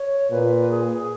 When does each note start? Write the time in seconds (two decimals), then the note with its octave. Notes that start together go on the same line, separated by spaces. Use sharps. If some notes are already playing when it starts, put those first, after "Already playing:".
Already playing: C#5
0.30 A#2 B4
0.70 G#4